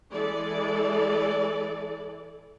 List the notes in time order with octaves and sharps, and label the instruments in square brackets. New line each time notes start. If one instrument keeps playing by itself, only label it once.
[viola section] E3 G#3 A4 D5